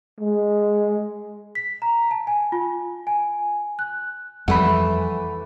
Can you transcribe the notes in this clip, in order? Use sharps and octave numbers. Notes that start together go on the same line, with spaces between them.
G#3
B6
A#5
A5
G#5
F4
G#5
F#6
F2 E3 G3 A3 F#5 B5